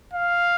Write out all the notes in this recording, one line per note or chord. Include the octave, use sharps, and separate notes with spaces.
F5